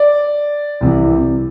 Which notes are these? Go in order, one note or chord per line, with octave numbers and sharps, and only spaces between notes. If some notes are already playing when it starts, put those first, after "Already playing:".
Already playing: D5
C2 C3 E3